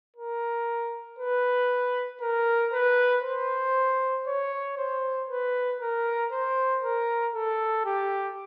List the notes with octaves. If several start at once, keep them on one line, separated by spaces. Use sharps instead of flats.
A#4
B4
A#4
B4
C5
C#5
C5
B4
A#4
C5
A#4
A4
G4